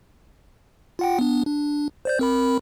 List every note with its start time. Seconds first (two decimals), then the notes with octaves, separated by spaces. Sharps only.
0.99 F4 F#5 G5
1.19 B3 D4
1.46 D4
2.05 C5 D5 G6
2.19 C4 A#4 B5